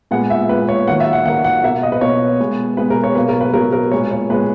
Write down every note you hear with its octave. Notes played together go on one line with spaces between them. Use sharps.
A#2 G#3 B3 F#5
E5
A#2 G#3 B3 B4
C#5
D#3 F#3 A#3 F#5
E5
F#5
D#3 F#3 A#3 F#5
F#5
B2 A#3 E5
D#5
B4
B2 A#3 C#5
B2 G#3 B3
B2 G#3 B3 B4
A#4
C#5
B2 F#3 A#3 B4
A#4
B4
B2 F#3 A#3 A#4
A#4
A#2 G#3 B3 C#5
C#5
A#2 G#3 B3 B4